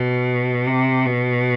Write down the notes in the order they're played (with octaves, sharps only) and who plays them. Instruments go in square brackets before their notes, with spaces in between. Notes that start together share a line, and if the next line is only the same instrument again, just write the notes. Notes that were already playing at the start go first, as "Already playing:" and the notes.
Already playing: [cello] B2
C3
B2